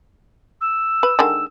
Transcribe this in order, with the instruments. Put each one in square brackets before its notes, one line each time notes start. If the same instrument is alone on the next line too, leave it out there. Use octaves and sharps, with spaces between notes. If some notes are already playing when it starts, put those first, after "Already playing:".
[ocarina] E6
[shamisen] B4
D3 D#3 G#3